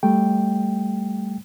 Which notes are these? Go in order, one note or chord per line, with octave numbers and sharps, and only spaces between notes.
G3 A3 G5